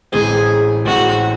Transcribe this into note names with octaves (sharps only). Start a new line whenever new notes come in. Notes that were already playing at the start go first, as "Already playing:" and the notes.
A1 A2 E3 G#3 C4 G#4
A1 A2 E3 G#3 C4 F#4